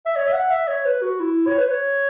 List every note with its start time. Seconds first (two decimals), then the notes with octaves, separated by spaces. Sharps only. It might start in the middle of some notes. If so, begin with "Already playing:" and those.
0.06 E5
0.16 C#5
0.27 E5
0.33 F#5
0.50 E5
0.68 C#5
0.85 B4
1.02 F#4
1.20 E4
1.47 C#5
1.58 B4
1.68 C#5